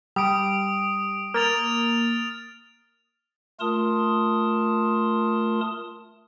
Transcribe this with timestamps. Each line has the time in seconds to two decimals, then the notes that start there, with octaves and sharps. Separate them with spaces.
0.16 G3 D#6 D7
1.34 A#3 F6 A6 F7
3.60 A3 F4 A#4 A5 C6 D#6